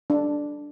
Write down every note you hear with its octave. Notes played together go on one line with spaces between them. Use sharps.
D4